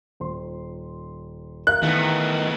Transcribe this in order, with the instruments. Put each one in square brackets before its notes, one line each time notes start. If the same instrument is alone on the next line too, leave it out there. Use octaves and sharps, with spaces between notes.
[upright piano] D#1 C5 C6
[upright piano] A#4 E5 F5 [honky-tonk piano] F#6
[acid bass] D#3 [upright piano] E3 [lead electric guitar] A3 B3